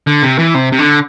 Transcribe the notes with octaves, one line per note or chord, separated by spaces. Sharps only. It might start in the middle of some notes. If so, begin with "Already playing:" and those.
D3
C3
E3
C3
C3
D3